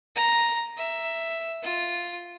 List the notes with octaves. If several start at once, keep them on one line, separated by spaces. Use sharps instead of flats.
A#5
E5
F4